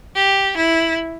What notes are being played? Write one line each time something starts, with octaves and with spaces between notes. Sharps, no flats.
G4
E4